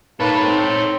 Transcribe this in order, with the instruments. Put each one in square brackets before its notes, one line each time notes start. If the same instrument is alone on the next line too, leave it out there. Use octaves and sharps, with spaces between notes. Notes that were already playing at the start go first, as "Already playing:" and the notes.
[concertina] A#3 B4 [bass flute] D#4 [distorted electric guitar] A4 C#5
[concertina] C4